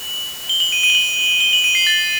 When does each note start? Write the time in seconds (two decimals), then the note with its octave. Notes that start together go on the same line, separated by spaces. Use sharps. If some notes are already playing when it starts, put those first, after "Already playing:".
Already playing: F#7
0.49 G7
0.60 F#7
0.72 D#7
0.83 D#7
0.90 G7
0.95 F#7
1.40 G7
1.53 F#7
1.64 D#7
1.75 C7
1.87 A6